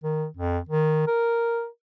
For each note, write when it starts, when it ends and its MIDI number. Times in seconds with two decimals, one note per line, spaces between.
0.04 0.26 51
0.37 0.59 41
0.69 1.03 51
1.07 1.67 70